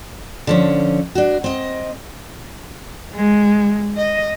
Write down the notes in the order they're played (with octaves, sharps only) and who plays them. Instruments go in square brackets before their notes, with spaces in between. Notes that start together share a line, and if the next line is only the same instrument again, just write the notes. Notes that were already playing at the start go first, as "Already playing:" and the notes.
[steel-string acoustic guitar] D3 F3 C#4
D4 F#4
C4 D#5
[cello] G#3
D#5